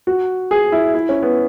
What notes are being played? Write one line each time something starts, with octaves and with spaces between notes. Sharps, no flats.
F#4
G#4
E4
E4
C#4
B3